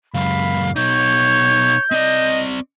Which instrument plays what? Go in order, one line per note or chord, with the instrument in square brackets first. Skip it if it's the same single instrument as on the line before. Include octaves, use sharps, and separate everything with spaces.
[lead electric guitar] C#2 F#2 [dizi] F5 [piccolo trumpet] B5
[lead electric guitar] B2 D#4 [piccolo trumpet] C#5 [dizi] G6
[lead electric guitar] C4 D5 [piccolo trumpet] D#5